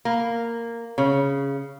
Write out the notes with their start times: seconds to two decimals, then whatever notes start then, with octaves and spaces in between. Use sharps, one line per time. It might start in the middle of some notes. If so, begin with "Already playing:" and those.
0.05 A#3
0.98 C#3